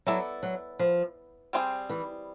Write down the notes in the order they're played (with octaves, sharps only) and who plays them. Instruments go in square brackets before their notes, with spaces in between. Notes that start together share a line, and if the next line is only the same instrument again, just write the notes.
[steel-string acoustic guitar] F#3 [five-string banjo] B3 E4 A4 D5
[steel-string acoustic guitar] F#3
F3
[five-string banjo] G3 C4 F4 G#4 C5
[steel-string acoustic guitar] E3